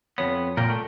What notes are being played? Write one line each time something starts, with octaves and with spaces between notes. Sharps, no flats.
F2 B3 C#5
A#2 A#4 G5
A3